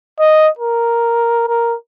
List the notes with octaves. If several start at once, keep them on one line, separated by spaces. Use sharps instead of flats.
D#5
A#4
A#4